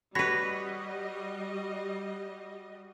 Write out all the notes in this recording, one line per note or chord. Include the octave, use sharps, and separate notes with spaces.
G3 F#4 B4 C#5 D#5 B5 A#6